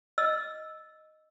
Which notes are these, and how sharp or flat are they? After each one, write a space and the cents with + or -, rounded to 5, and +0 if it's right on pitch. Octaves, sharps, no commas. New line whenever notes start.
D#5 +0 E6 +0